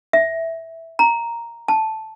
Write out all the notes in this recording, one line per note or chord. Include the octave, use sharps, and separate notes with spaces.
E5
A#5
A5